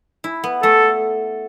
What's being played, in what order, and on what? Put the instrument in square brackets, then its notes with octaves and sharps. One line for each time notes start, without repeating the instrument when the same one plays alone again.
[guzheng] E4
B3
[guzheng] A3 [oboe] A4